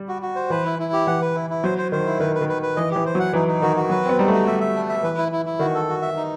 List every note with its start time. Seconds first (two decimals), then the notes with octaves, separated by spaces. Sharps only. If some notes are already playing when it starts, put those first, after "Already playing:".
Already playing: G3
0.08 F#4
0.22 F#4
0.36 C5
0.50 E3 B4
0.65 E4
0.79 E4
0.93 G4
1.07 E3 F#5
1.21 B4
1.35 E4
1.50 E4
1.63 F#3 C5
1.78 C5
1.92 D#3 C5
2.06 E4
2.20 D#3 B4
2.35 B4
2.41 D#3
2.49 B4
2.62 B4
2.76 E3 D#5
2.91 E3 G4
3.06 C5
3.15 F#3 F#5
3.33 E3 D#4
3.48 D#4
3.62 D#3 F#4
3.77 F#4
3.90 F#3 B4
4.04 B3 C4
4.18 G3 D#4
4.28 A3 F#4
4.47 G3 E5
4.60 E5
4.75 A3
4.89 E5
5.03 E3 B4
5.18 E4
5.32 E4
5.46 E4
5.59 D#3 F#4
5.74 A4
5.89 F#4
6.02 E5
6.16 D#4